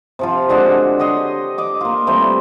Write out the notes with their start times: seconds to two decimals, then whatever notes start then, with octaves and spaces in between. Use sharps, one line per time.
0.19 C3 F3 F4
0.49 D3 G#3 D4 F#4
0.99 G4 C#5 D#5 C6
1.58 D#5 D6
1.81 A#3 F4
2.07 E3 G3 A3 C4